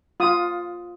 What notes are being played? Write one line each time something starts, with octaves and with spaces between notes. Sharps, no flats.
F4 D#6